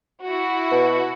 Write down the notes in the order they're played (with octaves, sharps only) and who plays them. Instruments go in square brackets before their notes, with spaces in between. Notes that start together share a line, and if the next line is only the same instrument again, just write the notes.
[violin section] E4 F#4
[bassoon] B2